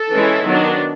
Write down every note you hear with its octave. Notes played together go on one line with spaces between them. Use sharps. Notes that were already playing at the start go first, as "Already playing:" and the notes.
Already playing: A4
E3 G#3 C#4 E4
D#3 F#3 B3 D4